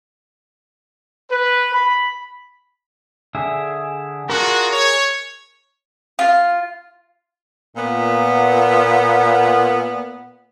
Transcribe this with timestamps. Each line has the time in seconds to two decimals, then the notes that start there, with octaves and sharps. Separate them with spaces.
1.30 B4
1.72 B5
3.35 D3 G#4 E5
4.30 D4 F4 F#4 G#4 A#4
4.71 C#5
6.19 F4
7.77 A#2 B3